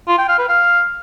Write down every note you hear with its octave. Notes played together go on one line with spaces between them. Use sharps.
F4
G5
F5
B4
F5